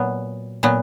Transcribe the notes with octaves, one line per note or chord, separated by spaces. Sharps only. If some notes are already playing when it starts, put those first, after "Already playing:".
Already playing: A#2 F#3 B3
A#2 F#3 B3